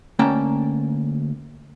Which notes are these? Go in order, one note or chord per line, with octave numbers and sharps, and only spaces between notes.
D2 A#3 C#4 G5 A5 A#5